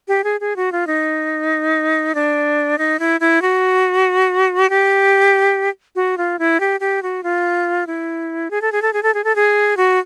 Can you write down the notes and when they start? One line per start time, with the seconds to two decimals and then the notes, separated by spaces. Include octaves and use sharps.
0.08 G4
0.24 G#4
0.41 G#4
0.56 F#4
0.72 F4
0.87 D#4
2.15 D4
2.78 D#4
2.99 E4
3.20 E4
3.42 F#4
4.70 G4
5.96 F#4
6.18 F4
6.39 E4
6.60 G4
6.80 G4
7.03 F#4
7.23 F4
7.87 E4
8.51 G#4
8.62 A4
8.72 G#4
8.82 A4
8.93 G#4
9.03 A4
9.14 G#4
9.24 A4
9.36 G#4
9.77 F#4